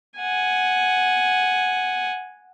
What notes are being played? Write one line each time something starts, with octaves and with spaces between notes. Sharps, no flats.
F#5 G#5